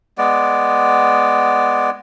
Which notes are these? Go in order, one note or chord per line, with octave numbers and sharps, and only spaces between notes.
G#3 B3 D5